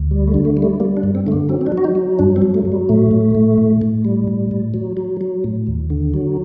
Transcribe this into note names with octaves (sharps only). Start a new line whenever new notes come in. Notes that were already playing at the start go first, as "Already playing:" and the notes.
Already playing: D2
G3
A3
D3
A3
G3
A3
G3 A#3
D4
G2
C4
D3 A3
A#3
F#3 C4
C4
D4
F#3
F#4
D#4
F#3
G2 D4
C4
F#3
A3
F#3
G3
A2 A3
A2
A2
A2
A2
G3
A2
A2
F#3
F#3
F#3
A2
D#2
D3
F#3